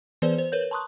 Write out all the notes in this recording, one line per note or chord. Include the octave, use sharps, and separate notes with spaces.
E3 B3 G#4 B4 C5 D5
C5
A#4 B4 C#5 G6
A5 A#5 C6 C#6 D#6 F#6